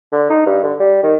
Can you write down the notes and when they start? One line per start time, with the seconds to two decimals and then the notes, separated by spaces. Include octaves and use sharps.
0.12 D3
0.30 D#4
0.46 G2
0.63 D3
0.80 G3
1.03 D#3